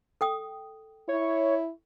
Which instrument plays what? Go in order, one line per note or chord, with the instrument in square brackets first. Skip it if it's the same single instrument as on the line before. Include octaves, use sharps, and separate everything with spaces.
[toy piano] A4 G5 D#6
[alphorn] E4 [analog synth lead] C#5